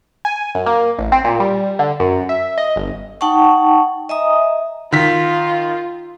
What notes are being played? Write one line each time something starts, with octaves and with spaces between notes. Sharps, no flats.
G#5
F#2
A#3
A1
C4
A#2
G3
D3
F#2
E5
D#5
G1
D#4 F#5 G5 A5 C#6
D#5 E5 G#5 A#5 D#6
D#3 F4 B6